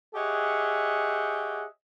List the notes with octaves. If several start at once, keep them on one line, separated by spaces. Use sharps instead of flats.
G4 G#4 C#5 D#5 E5 F#5